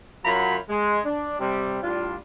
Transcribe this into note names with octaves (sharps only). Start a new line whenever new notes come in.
F#2 F#3 F4 A#5 B5
G#3
D4
C3 G3
A2 G3 D4 F4